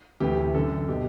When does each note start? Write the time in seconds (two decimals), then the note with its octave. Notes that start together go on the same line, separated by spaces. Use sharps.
0.20 D2 C3 E3 G4
0.54 F#2 D3 A4
0.88 B2 G4